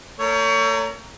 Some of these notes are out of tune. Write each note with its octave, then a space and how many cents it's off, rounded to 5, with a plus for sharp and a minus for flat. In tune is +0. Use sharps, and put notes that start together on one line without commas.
A3 +40 A#4 +0 C#5 +30